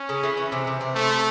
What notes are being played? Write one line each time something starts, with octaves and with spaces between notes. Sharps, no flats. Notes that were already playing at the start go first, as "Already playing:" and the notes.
Already playing: C#4
C#3
E3
E3
C3
C3
C4
C3 A3
C3